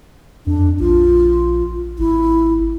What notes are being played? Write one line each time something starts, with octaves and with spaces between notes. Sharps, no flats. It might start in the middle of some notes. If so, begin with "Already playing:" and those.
F2 D4
A#1 F4
G#1 E4